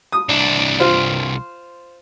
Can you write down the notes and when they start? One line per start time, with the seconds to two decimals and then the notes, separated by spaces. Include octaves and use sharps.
0.12 D#6
0.29 C2 D4
0.80 F4 C5